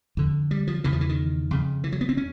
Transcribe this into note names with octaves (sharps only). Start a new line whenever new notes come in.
F2 D3
G3
F3
E2 C#3 E3
F3
E3
D#3
F2 C#3
E3
F#3
B3
C4
C#4